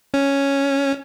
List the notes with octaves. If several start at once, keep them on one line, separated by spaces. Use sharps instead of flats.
C#4